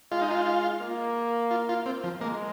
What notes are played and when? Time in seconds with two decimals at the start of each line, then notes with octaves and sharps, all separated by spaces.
0.12 G#3 F4
0.22 D#4
0.31 F4
0.81 A#3
1.51 F4
1.69 F4
1.86 C4
2.04 F3
2.21 G#3 A#3